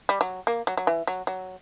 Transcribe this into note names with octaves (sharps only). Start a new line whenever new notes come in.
G3
F#3
A#3
F#3
F#3
E3
F#3
F#3